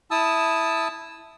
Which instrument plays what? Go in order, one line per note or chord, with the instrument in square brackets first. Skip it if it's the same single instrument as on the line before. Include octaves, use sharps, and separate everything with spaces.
[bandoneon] E4 A5 D#6 E6